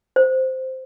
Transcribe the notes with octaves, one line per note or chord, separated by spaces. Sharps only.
C5